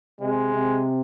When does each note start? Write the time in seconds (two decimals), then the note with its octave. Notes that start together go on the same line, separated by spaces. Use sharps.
0.20 C3 G#3
0.52 C3